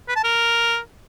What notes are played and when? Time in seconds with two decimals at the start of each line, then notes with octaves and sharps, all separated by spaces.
0.08 B4
0.16 A5
0.24 A#4